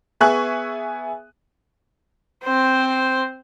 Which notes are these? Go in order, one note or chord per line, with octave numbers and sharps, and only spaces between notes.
B3 G#4 E5 G#5 C#6 F#6
C4 C5